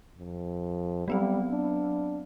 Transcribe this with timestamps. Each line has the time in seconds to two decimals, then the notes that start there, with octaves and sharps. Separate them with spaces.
0.18 F2
1.08 F#3 G3 B3 C4
1.51 D4